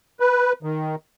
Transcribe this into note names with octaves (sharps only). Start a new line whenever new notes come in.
B4
D#3